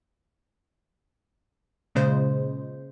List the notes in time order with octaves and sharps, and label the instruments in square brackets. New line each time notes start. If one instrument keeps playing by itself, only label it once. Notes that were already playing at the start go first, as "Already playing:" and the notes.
[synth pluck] A#2 C#3 G#3 C5